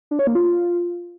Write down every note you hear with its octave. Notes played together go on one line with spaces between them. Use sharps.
D4
C#5
A#3
F4